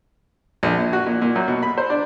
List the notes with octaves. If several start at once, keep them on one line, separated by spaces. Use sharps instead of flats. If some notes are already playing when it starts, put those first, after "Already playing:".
A#1
A#2
F#4
A#2
A#2
F#2
B2
B5
C5
D4